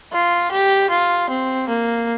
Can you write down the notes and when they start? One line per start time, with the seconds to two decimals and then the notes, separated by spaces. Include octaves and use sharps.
0.13 F4
0.51 G4
0.90 F4
1.30 C4
1.68 A#3